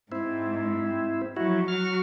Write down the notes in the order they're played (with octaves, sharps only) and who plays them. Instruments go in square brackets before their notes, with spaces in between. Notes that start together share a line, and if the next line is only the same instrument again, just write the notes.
[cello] G#2 [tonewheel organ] C4 E4
[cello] F3 F#3 [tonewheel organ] E4 F#4
[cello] F#3 F#4 [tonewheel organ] F6